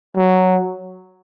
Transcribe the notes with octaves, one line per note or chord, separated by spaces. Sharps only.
F#3